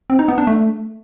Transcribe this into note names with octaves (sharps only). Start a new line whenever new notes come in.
C4
D#4
B3
D4
A3